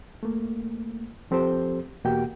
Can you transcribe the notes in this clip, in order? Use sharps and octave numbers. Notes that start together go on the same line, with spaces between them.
A3 A#3
F3 C4 G4 A4 C5
E2 B2 A#3 F#4 G4 G5